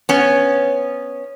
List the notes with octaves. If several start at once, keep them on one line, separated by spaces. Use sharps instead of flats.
B3 C#4